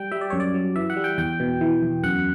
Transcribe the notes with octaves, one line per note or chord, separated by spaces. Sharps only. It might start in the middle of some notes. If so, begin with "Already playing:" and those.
Already playing: G3 G5
G3 E5
D5
F#2 C#5
D5
F#3
E3 E5
F#5
G3
G5
E2 G5
B2
E3
E2
F#2 F#5